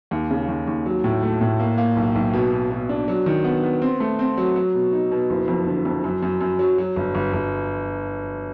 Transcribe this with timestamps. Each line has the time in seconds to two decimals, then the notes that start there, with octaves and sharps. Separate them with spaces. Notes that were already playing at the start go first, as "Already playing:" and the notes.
0.11 D#2
0.31 C#3
0.48 D#2
0.67 D#2
0.86 F#3
1.04 A2
1.23 A3
1.41 A2
1.60 A#3
1.78 A#3
1.96 B1
2.15 B1
2.33 B2
2.52 B2
2.71 B2
2.89 D4
3.08 F#3
3.26 D#3
3.44 B3
3.63 B3
3.82 C4
4.00 A3
4.19 C4
4.37 F#3
4.56 F#3
4.74 B2
4.93 D#4
5.11 B2
5.30 F#1
5.48 F2
5.67 D3
5.85 F2
6.04 F#2
6.23 F#2
6.41 F#2
6.59 F#3
6.78 F#3
6.96 G1
7.15 G1
7.33 G1